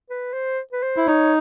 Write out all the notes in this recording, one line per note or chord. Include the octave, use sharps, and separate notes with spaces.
B4
C5
B4
C5
E4
D#4 C#5